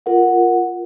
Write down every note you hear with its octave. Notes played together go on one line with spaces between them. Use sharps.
F4 A#4 F#5